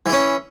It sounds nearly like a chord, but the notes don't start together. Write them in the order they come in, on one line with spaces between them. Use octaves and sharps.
E3 E4 C#4